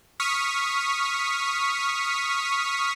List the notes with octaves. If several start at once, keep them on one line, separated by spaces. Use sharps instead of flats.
C#6 D#6 F6 B6